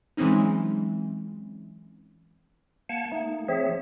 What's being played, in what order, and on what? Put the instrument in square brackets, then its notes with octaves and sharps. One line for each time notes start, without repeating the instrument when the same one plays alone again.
[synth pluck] E3 F#3 G#3 C4 C#4 D#4
[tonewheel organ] A#3 F#5 A5 G#6
A3 A#3 D#4
F3 C4 G#4 C#5 E5